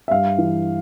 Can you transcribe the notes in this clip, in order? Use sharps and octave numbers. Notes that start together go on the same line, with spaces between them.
E5
G2 F5
E3